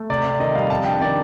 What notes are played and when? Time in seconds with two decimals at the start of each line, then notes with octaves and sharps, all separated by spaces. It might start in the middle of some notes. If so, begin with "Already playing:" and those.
Already playing: A3
0.10 C3 D5
0.25 C4
0.40 D#3 D#5
0.55 G3 F5
0.70 F2 A5
0.85 D4 G5
1.01 D#3 D5